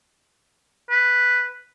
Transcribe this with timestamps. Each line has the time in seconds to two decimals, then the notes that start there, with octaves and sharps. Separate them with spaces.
0.90 B4